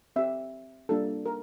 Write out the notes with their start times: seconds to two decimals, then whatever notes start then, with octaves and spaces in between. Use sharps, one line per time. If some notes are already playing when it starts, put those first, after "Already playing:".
0.16 C4 G4 E5
0.89 G3 A#3 D4 F4 A4
1.26 A#4